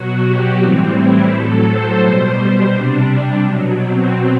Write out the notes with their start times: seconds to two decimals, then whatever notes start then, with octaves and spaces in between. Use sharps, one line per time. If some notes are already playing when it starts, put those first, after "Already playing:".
Already playing: B2 F#3 F#4
0.25 G4
0.60 A2 E3 G3 C4
0.95 E4
1.31 A2 F#3 A4
1.67 C5
2.02 B2 G3 C5
2.38 C5
2.73 C3 G3 D4
3.44 B2 F#3
3.80 C4